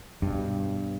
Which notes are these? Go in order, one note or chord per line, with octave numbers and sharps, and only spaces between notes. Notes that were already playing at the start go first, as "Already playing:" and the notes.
G2 B2